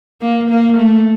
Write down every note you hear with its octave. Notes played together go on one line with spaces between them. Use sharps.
A#3
A#3
A3